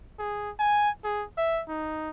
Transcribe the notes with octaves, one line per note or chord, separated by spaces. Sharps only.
G#4
G#5
G#4
E5
D#4